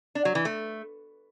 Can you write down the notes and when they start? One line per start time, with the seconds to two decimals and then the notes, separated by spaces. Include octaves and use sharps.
0.15 D4
0.25 F#3
0.35 E3
0.45 A3